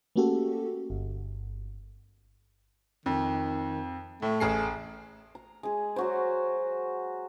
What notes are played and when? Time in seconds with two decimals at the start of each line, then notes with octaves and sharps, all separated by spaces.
0.16 A3 A#3 C#4 F#4 G4 A4
0.90 G1
3.06 F2 D#3
4.22 A2 A3
4.40 A1 G#4 C7
5.35 A#5
5.63 G#3 G#4
5.96 F#3 F#4 C5